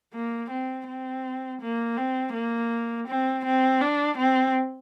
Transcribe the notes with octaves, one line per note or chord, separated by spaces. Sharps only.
A#3
C4
C4
A#3
C4
A#3
C4
C4
D4
C4